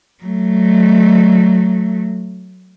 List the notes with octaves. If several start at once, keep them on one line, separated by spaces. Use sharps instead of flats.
F#3 A3